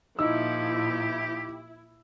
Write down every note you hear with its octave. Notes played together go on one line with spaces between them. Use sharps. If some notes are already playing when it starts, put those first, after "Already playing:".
A#2 F3 D#4 E4 G4 E6